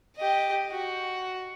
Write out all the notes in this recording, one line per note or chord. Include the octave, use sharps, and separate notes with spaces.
G4 D#5
F#4